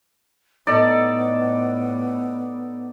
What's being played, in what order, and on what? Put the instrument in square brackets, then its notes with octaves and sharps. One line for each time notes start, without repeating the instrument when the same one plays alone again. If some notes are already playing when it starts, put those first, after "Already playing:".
[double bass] A2 [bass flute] B3 [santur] D#4 A4 [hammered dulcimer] D5